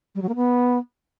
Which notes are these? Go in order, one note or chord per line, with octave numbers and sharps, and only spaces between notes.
G3
F#3
A#3
B3